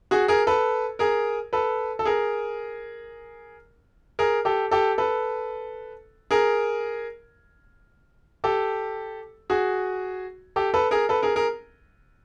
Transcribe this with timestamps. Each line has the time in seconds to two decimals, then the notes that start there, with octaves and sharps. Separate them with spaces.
0.11 F#4 G#4
0.28 G#4 A#4
0.47 A4 B4
0.99 G#4 A#4
1.53 A4 B4
1.99 A4
2.05 G#4 A#4
4.19 G#4 A#4
4.45 G4 A4
4.71 G4 A4
4.98 A4 B4
6.31 G#4 A#4
8.44 G4 A4
9.50 F#4 G#4
10.56 G4 A4
10.74 A4 B4
10.91 G#4 A#4
11.09 A4 B4
11.23 G#4 A#4
11.36 G#4 A#4